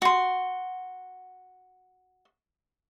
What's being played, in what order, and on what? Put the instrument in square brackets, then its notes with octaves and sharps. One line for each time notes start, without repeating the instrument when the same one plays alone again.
[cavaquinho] F#4 C6